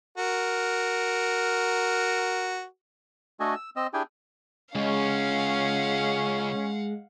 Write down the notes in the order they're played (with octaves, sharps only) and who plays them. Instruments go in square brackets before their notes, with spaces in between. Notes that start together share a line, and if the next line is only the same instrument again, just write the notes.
[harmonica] F#4 A#4
[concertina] A3 D4 F#4 A4 D#5 G#5
E6
C4 D#5 E6
D4 E4 G4 G#4 G5 G#5
[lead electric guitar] C#2 [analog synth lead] G#3 [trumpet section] C#4 [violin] F5 F#5